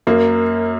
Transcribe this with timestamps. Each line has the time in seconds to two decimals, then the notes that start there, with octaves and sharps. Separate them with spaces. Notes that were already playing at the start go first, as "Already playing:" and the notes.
0.07 F#2 A#3